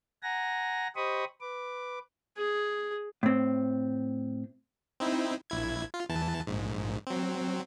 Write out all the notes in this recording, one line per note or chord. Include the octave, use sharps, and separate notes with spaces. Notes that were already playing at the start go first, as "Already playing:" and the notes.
F#5 G#5 A#5 A#6
G4 C5 D#5 B5 C#6 D#6
B4 D6
G#4
A2 C4
C4 D#4 E4
A#1 E4 G#6
F4
E2 E3 A5
A#1 G#2
F#3 C4